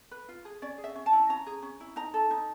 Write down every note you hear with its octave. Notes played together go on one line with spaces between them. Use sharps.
B4
F4
G#4
C#4 D5
G#4
E5
C#4
A5
E4
C#4 A#5
G#4
C#4
E4
D#4 A#5
A4
D#4